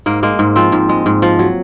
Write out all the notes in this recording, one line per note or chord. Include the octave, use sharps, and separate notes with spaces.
G#2 A#3
G#3 A#3
G#2
F3 C4
G#2
G#3
G#2
F3
F#3